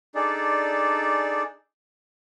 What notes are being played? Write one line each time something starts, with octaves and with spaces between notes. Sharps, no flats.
D4 D#4 G#4 A4 D5